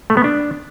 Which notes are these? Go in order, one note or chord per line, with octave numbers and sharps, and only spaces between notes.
A3
B3
D4